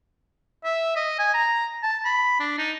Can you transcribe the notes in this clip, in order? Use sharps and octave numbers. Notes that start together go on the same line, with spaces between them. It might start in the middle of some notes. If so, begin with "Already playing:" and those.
E5
D#5
G#5
A#5
A5
B5
D4
D#4